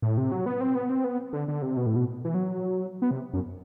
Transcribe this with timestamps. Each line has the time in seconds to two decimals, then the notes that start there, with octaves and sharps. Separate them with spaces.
0.02 A2
0.18 C3
0.32 F#3
0.46 B3
0.61 C4
0.75 B3
0.89 C4
1.04 B3
1.33 D3
1.48 D3
1.62 C3
1.77 B2
1.86 A2
1.96 B2
2.25 E3
2.34 F#3
3.02 B3
3.11 C3
3.34 F#2